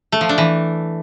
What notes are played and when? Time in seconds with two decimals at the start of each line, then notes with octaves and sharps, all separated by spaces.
0.12 A3
0.21 F3
0.29 D4
0.38 E3